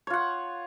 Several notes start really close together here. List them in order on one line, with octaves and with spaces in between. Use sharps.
C#5 F4 F#5